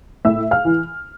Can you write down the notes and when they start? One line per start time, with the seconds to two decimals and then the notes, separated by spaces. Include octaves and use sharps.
0.25 A2 E5 E6
0.51 F5 F6
0.65 E3